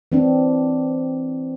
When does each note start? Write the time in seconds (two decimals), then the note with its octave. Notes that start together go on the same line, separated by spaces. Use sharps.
0.12 E3 C4 D4